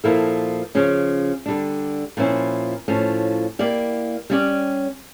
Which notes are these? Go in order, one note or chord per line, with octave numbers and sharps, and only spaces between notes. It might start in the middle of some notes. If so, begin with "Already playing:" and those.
A#2 F3 A#3 E4 A4
C#3 F3 C#4
D3 G3 D4
A#2 F3 C#4 E4
A2 F3 C#4
A#3 E4 G4 D5
G3 C#4 G4 D5